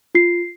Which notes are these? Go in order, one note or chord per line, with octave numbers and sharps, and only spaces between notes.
F4 C7